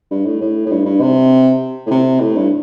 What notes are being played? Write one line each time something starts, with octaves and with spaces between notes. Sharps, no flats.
G2
A2
A2
A2
G2
G2
C3
A2
C3
A2
G2